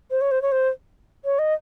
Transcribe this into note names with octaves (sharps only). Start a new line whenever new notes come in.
C5
C#5
C5
C#5
C5
C#5
D#5